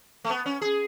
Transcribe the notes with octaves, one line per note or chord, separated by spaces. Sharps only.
A3
B3
C#4
G#4